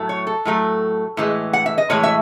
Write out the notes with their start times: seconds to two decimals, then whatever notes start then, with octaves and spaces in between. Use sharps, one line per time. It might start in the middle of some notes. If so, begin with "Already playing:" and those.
Already playing: A2 F#3 A3
0.09 C#5
0.27 A4
0.45 A2 F#3 A3
1.17 A2 E3 G#3
1.53 F#5
1.66 E5
1.78 D#5
1.90 A2 E3 G#3 C#5
2.03 E5